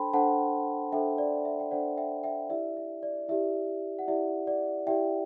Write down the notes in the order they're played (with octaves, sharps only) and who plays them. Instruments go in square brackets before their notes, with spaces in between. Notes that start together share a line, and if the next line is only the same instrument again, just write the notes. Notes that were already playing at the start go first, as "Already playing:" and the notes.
Already playing: [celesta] D4 A4 C5 G5 A5 B5 C6
D4 A4 C5 F#5 A5
D4 A4 C5 E5 G5
D5
E5
G5
D4 A4 C5 D5 F#5
E5 G5
E5 G5
E4 G4 D5 E5
E5
D5
E4 G4 D5 E5
F#5
E4 G4 D5 E5
D5 F#5
E4 G4 D5 E5 G5